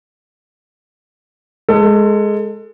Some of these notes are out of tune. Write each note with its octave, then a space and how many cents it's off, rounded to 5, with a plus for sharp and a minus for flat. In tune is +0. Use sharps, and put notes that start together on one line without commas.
G#3 +5 A4 +25